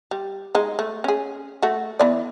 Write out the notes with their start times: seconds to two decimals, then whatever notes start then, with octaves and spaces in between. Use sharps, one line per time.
0.11 G3
0.55 G#3 D#4
0.79 A3
1.04 C#4 G#4
1.62 A3 F#4
1.99 E3 B3 D5